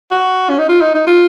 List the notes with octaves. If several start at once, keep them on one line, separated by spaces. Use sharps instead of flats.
F#4
C#4
D#4
F4
D#4
D#4
F4